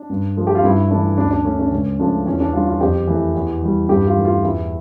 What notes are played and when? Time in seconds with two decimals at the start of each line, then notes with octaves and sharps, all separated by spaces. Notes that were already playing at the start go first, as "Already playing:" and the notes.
Already playing: D4
0.10 G2
0.37 F3 A3
0.47 G4
0.55 F4
0.64 G2 E4
0.91 E3 A3 D4
1.18 D2 D4
1.31 D4
1.45 D3 A3 C#4
1.59 D4
1.72 C#2 C#4
1.99 C#3 F3 A3 D4
2.26 E2 C#4
2.40 D4
2.53 D3 G3 F4
2.67 F4
2.81 F2 G4
3.07 E3 A3
3.35 E2
3.62 E3 G3
3.89 G2 G4
4.07 F4
4.16 E3 A3
4.25 F4
4.43 E2 E4